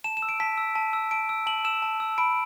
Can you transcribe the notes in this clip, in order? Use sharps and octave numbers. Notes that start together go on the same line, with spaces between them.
A5 E7
E7
E6
D7
A5 B6
E6
A5
E6
A5 D7
E6
A5 F#7
E6 E7
A5
E6
B5 D7